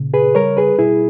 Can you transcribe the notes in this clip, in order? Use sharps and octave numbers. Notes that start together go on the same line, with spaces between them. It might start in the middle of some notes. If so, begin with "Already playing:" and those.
Already playing: A#2 C#3
G#4 B4
G3 A#4 C#5
G#4 B4
B2 E4 G#4